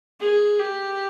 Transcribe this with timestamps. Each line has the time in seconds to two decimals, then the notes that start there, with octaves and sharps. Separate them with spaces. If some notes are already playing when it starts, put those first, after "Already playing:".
0.20 G#4
0.60 G4